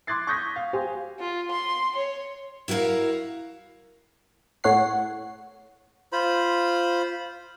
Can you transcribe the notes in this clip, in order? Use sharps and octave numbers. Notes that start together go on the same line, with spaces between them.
C6 D6 F#6 G#6 A6 C7
C#6 D#6 G6 G#6 A#6 B6
F5
G4 C5 F5 G#5
F4
C6
C#5
E4 F#4 A4 A#4 F5
A2 C#5 F#5 C7
F4 C5 B5